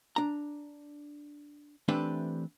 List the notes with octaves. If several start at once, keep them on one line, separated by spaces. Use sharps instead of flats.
D4 A#5
E3 A3 C4 D4 G4 B4